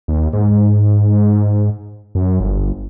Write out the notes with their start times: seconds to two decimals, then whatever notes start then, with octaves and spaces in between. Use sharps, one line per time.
0.08 D#2
0.33 G#2
2.15 F#2
2.40 G1